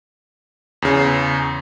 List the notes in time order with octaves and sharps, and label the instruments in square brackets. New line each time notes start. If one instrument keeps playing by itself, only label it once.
[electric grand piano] E2 C#3